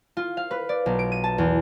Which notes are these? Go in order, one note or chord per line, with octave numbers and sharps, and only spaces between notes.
F4
F5
B4
D5
B1
D7
D#7
A5
E2